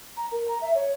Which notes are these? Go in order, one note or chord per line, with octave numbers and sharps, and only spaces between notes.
A#5
A#4
A#5
E5
C#5